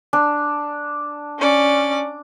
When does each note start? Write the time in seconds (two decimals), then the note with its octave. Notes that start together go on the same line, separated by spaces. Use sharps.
0.13 D4
1.39 C#4 D5